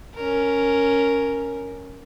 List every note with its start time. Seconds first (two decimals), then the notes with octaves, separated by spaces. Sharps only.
0.15 C#4 A#4